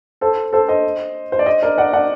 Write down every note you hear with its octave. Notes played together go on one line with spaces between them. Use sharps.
A4 C5
A4 C5
C5 D#5
C5
D5
C5 D#5
A#4 D5
D5 F#5
D5 F#5